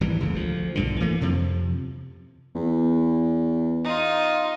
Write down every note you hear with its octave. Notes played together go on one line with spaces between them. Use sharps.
G#1 E3 G3
F1 C#2 C#3
D2 F3
B1 G2 D3
E3 F#3 A3 A#3
F2 C3 F3
E2
D#4 F4